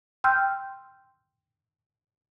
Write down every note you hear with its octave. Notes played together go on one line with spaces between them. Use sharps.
G5 C6 E6 F6 G6